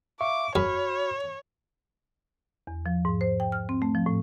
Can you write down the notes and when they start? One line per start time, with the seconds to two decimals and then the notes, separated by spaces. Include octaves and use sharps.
0.21 E5 F5 C#6 D6
0.56 F#2 F#4 C#5 B5 F6
2.67 E2
2.86 F3
3.05 G#2
3.21 C5
3.40 G5
3.52 F6
3.69 C4
3.82 A3
3.95 F3
4.06 A2